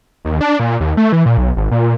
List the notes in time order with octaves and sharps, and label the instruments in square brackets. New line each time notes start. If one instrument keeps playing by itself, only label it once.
[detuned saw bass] D#2
D4
A#2
D#2
A3
E3
A#2
B1
G#1
A#2